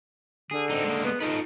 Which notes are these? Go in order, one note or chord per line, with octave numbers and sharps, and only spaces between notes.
D3 G#4
C4 D#4
G#3 A#3
B3
D#4 F4 A4 B4